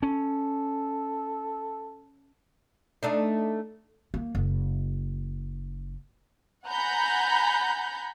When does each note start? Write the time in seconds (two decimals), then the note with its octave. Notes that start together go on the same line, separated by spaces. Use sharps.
0.03 C#4 A4
3.03 A3 D4 D#4
4.14 A#3
4.35 F#1
6.67 F#5 G#5 A#5 B5 G6